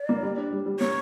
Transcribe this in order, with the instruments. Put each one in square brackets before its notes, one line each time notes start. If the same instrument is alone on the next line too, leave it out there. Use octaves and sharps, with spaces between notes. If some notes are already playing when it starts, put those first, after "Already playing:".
Already playing: [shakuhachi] D5
[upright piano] A#3
G3
D4
G3
G3
[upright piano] A#3 [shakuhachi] C#5